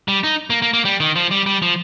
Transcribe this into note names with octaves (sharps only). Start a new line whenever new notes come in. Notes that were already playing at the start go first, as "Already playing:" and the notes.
G3
D#4
A#3
A#3
A#3
G3
D#3
F3
G3
G3
F3